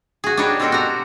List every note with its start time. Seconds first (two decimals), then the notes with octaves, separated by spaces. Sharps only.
0.24 F#4 G#4
0.37 D4 D#4 F#4 G4 B4 C#5
0.60 B2 C4 D4 A4 A#4 C5
0.72 F#4 G4 A#5